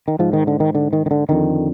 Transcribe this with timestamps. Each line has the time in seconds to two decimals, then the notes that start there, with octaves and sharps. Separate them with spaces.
0.08 D#3
0.19 G#2 F3
0.33 D#3
0.47 D3
0.60 D#3
0.75 D3
0.93 D#3
1.06 D#3
1.11 D3
1.29 F2 D3 D#3